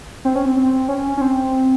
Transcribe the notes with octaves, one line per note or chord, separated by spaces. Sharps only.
C4
C#4
C4
C4
C#4
C#4
C4